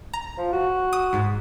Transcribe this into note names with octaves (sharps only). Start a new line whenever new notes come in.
A#5
F3
F#4
D#6
G#2